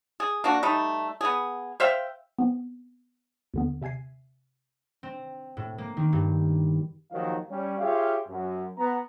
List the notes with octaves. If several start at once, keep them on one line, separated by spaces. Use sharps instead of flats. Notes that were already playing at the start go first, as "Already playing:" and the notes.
G#4
A#3 D4 F#4
G3 A3 D#4
B3 G#4
C5 E5 F5 G5
B3 C4
D#2 D3 B3
C3 E5 G#5 G#6 C7
C4
A2
A#3
D#3
G2
D#2 D#3 F3 F#3 D#4 F5
G3 C#4
F4 G4 G#4 C#5 E5 F5
F#2
B3 A#5